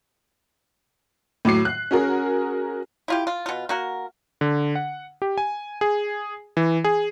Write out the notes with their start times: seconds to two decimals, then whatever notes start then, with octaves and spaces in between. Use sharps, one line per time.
1.45 A2 F#3 D6 C7
1.65 F#6
1.91 C#4 F#4 G#4 A#4
3.08 E4 F4 G4
3.27 F4
3.46 B2 F4
3.69 A#3 F#4 A#4
4.41 D3
4.75 F#5
5.22 G4
5.38 G#5
5.81 G#4
6.57 E3
6.84 G#4